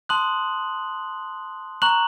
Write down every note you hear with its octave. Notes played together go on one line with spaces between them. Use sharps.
A5 C6 D#6 F#6 F#7
A#5 C#6 F#6 F#7